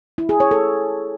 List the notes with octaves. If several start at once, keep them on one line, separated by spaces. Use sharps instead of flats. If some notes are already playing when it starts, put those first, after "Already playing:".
E4
G#4
C#5
A4